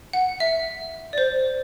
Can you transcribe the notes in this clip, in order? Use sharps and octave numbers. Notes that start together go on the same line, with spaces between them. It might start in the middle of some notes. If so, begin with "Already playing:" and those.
F#5
E5
D5
C5